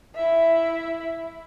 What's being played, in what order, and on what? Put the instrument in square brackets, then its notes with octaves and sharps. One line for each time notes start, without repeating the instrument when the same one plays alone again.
[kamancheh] E4 E5